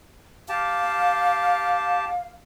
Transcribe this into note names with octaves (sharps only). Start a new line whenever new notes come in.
G4 F5 A5